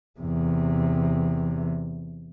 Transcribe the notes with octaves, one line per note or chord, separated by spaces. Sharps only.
E2 C3